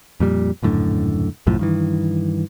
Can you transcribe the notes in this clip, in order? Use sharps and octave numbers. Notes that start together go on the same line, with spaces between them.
F2 A#2 G3
D#1 F#2 A2 D3
C2 F#2 A2 F3
G2 D#3 E3